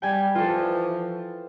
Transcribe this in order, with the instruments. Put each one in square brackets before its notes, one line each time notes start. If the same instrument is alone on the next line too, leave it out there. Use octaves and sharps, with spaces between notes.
[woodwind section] G3 [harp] G5 G#5
[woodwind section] E3 F3 [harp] F4 A4